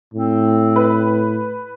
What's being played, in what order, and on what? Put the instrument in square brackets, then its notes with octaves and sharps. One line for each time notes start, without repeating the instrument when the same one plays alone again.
[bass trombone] A2 [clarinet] C4
[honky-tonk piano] B4